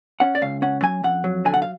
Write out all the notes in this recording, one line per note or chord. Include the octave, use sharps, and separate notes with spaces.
C#4 F#5
D5
C#2 F5
C#4 F#5
F#3 G#5
F2 F#5
F#3
D3 G#5
F#5
F5